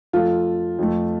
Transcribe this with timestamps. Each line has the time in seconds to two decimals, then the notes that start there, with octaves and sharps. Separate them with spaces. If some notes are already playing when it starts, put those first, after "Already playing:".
0.13 F2 F3 A3 F4 A4
0.79 F2 F3 A3